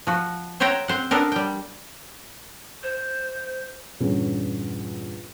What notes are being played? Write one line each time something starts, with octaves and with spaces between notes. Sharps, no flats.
F3 F#4
C5 C#5 E5 F#5 G5 A#5
C4 C5 F#5
B3 D4 A4 A#4
G3 G5
C5
E2 G2 A#2 D3 C#4